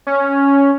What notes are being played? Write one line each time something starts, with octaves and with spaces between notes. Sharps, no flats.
C#4